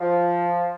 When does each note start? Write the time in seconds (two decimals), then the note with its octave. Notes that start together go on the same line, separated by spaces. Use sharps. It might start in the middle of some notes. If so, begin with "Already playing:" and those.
0.01 F3